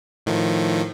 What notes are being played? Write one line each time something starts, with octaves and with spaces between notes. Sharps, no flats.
A2 D#3 F3